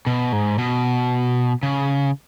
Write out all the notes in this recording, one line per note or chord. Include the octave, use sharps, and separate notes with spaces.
B2
G#2
B2
C#3